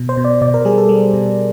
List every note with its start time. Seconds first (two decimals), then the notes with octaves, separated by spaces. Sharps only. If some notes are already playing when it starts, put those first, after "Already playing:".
Already playing: B2
0.09 C5
0.17 B2
0.24 D5
0.41 B2 D5
0.54 A#4
0.65 G3 G#4
0.78 A4
0.89 G3
1.14 B2